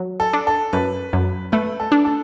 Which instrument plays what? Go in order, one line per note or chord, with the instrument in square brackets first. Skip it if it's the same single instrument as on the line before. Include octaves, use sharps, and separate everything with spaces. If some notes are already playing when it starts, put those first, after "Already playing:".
Already playing: [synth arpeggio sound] F#3
[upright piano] A4
[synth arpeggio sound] D4
[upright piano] A4
[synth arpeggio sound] F#2 [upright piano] B4
[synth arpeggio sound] F#2
[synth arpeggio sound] A3 [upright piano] B4
[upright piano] A4
[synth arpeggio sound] D4
[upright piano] A4